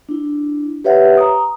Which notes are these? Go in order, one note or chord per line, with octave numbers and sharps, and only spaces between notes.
D4 E4
G4 B4 C#5 E5 F#5
A#5 D#6